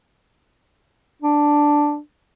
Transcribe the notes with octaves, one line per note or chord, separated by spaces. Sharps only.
D4